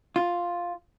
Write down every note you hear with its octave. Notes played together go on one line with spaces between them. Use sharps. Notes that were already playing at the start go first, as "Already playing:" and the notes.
F4